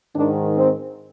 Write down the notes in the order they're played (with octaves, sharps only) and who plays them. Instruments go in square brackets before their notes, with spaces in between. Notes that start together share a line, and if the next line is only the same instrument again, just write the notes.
[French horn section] G#2 D#3 D4
C4